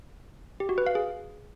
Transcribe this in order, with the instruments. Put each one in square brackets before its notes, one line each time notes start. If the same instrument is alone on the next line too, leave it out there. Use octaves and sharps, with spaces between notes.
[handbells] G4
F#4
B4
F5
G#4